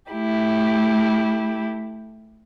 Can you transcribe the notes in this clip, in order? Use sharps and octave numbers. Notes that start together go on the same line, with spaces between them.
A3 E4 G4